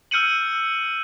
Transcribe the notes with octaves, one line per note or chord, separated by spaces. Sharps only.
E6 F6 G6 C#7 D#7 F#7